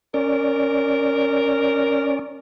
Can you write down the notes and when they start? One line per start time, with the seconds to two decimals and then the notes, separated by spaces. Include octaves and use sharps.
0.14 C#4 A#4 D5